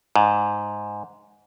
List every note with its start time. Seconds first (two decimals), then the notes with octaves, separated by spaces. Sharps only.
0.16 G#2